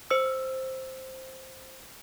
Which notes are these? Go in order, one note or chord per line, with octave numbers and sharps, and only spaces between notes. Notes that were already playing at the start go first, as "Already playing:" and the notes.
C5 E6